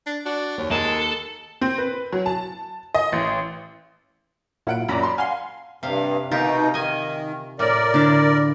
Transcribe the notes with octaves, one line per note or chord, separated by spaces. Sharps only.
D4
D4 F#4
D#2 C#5
G#3 A4 A#4
C4
B4
F#3
A5
D#5
A1
A#2 F#3 E4 F4 F#5 D7
F#2 A#2 D5 A#5 B5
C6
F5 F#5 G#5 C6
G2 C3 F5
B2 D#4 F4 G4 A#4
D#3 D#5 G#5
A2 A#4 D5
D3 E4 D6